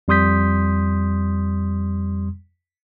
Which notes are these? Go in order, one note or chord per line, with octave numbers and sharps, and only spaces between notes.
F2 G3 C6 D#6 G6 B6